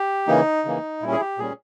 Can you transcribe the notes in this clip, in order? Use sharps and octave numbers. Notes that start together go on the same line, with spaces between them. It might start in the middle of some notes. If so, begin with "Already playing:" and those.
Already playing: G4
C#3 E3 A#3 D#4
C#3 E3 A#3
A#2 G3 C#4 E4
G#4
G4
A#2 G3 C#4 G#4